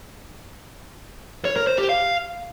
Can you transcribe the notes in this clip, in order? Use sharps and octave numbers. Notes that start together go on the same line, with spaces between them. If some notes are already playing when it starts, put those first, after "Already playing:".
C#5
A#4
C5
G4
F5